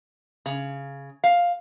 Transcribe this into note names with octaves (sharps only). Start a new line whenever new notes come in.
C#3
F5